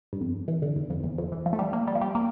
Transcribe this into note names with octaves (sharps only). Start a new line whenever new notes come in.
G2
F2
E3
D3
E2
F2
E2
F2
E3
F3
A3
G3
A#3
G3
F3
G3
A#3